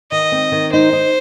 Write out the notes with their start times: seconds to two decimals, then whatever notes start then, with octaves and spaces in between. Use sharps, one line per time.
0.12 D#3 D#5
0.32 C4
0.52 D#3
0.72 D#4 C5
0.93 D#4